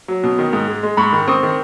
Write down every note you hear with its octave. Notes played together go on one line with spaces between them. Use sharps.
F#3
B2
D#3
G#2
G#3
G#3
G#2 B5 C#6
D#3
C4 C#6 D#6
D#3